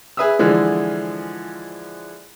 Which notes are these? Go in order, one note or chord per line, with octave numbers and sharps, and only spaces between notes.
G#4 B4 E5 D#6 E6
D3 E3 F3 G#3